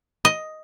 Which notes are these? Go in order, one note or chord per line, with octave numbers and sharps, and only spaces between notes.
D#5